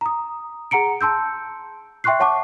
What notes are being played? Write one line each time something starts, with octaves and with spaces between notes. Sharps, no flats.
A#5 D#6
G#4 F#5 A#5 C#7 D7
A5 C6 E6 G6
E5 G5 C6 C#6 F#6 C7
C#5 F#5 A5 C#6 D6